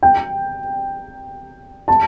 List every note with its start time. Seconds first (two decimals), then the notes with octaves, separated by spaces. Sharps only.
0.03 G5
1.88 A5